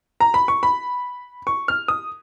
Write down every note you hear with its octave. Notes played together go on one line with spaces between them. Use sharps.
A#5
B5
C#6
B5
C#6
F6
D#6